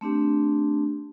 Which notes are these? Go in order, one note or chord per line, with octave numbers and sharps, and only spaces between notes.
A3 C4 D4 G4